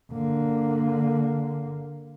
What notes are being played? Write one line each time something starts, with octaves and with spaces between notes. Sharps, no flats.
D3 A#3